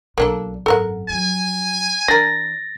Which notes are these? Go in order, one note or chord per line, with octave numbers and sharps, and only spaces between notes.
B1 A#3 D4 A4
G#1 F#2 A4 A#4 F#5
F2 F#3 G#5
E3 D4 A#4 A6 A#6